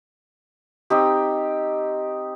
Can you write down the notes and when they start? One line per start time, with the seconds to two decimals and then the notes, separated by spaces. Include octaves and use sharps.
0.90 C4 D#4 G4